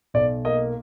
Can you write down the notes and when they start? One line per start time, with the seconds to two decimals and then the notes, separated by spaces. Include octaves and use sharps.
0.14 B1 D5
0.45 A#3 D#5